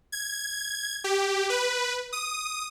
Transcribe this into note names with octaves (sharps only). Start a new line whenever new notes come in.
G#6
G4
B4
D#6